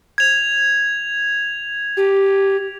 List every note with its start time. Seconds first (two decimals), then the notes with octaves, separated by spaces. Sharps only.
0.18 G#6 F7
1.97 G4